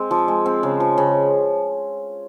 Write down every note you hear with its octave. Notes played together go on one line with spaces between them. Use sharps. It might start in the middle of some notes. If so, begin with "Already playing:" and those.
Already playing: G#3 C4
F3
G#3
C4
C#3
F3
C#3